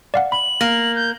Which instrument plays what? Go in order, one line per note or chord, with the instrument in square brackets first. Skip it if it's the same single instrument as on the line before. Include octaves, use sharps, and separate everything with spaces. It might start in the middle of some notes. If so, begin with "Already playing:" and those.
[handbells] D5 F5 F#5
[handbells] B5 [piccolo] F#7
[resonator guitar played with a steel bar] A#3 [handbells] A#6
[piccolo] G6